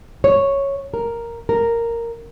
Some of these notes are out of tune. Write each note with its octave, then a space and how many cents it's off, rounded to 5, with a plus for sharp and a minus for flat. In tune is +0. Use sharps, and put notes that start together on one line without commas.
C#5 -5
A#4 +0
A#4 -5